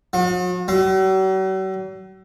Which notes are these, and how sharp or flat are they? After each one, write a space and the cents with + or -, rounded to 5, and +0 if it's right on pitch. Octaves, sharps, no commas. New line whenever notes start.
F#3 -45
F#3 +45